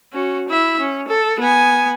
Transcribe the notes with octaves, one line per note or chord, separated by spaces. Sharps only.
C#4 F#4
E4 E5
C#4
A4
B3 G#5